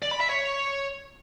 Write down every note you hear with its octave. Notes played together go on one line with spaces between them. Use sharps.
D5
B5
E5
C#5